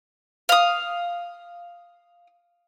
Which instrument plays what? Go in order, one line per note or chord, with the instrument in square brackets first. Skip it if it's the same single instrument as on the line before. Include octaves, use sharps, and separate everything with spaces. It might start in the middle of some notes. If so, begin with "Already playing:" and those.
[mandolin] F5 D#6